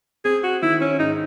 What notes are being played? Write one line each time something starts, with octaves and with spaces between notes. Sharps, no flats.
C4 G#4
F#4
D#3 E4
C#4
G#2 D#4